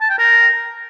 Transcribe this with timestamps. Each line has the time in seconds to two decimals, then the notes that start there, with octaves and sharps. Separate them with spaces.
0.01 A5
0.09 G5
0.18 A#4